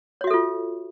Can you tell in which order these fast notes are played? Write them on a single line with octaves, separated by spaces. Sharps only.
C#5 F#4 E5 A4 F4